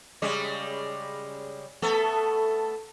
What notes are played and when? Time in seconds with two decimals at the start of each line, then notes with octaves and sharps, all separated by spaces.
0.22 C#3 G3 G#3
1.82 A3 B3 A4